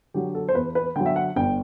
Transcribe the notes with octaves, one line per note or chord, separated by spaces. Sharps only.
D3 F#3 G4
A4
C5
E2 B4
B4
D3 F#3 G5
E5
F#5
G1 G5